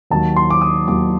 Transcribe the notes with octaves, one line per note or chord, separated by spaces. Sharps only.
D#2 D#3 F#3 A5
C6
D6
D#6
D#2 D#3 F#3 D6